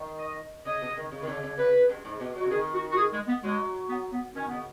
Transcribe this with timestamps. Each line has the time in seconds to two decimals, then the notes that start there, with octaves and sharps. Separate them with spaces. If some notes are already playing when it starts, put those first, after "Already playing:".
Already playing: D#3
0.19 D#5
0.65 C#3 D#5
0.81 B2
0.89 C#3
0.97 D#3
1.11 C#3
1.22 D#3
1.27 C#3
1.43 C#3
1.58 C#3 B4
1.89 F#2
2.05 G#2
2.20 B2
2.35 F#3 F#4
2.46 C#3
2.51 D#3 G#4
2.74 F#4
2.92 F#4
2.97 G#4
3.12 G#3
3.28 B3
3.43 F#3 G#3
3.89 B3
4.12 B3
4.35 D#3 C#4
4.47 C#3 B3